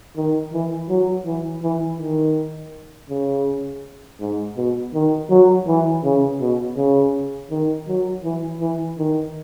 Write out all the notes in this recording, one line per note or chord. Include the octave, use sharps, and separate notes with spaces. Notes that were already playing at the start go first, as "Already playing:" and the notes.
D#3
E3
F#3
E3
E3
D#3
C#3
G#2
B2
D#3
F#3
E3
C#3
B2
C#3
D#3
F#3
E3
E3
D#3